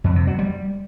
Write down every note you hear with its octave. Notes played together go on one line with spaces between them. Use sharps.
F2
C3
F#3
G3